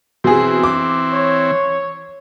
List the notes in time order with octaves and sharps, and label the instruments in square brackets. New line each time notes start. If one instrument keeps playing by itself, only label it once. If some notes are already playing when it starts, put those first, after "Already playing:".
[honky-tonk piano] B2 G#4 [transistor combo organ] E3 C4
[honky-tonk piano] D6
[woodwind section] C#5